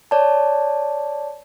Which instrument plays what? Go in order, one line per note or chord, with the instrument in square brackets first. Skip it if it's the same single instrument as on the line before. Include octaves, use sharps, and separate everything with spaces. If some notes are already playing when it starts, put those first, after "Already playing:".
[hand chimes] C#5 D5 A5